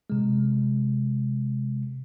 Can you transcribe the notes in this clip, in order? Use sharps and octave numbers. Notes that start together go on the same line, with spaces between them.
C3 G#3